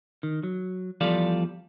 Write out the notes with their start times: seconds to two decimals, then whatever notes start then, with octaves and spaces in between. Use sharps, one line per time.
0.23 D#3
0.43 F#3
1.01 E2 F3 G3 A4 D5 F5